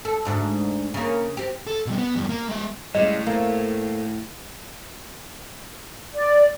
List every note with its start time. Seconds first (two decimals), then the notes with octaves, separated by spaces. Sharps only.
0.05 A4
0.25 D2 G#2 D4
0.94 C#3 A#3
1.37 C4 G4
1.67 A4
1.86 B2 G3
1.98 B3
2.16 E2 G2
2.29 A#3
2.48 G#3 E5
2.95 A2 C#3 G3 G#3 D#5
3.27 A3 A#3 C4
6.13 D5